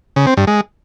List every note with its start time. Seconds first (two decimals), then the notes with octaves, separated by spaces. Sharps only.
0.16 C#3
0.27 C4
0.37 G2
0.47 G#3